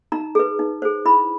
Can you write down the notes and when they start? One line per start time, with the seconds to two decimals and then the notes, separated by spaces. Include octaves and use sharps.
0.12 D#4 A#5
0.35 G#4 B4
0.59 D#4
0.82 G#4 C5
1.05 E4 B5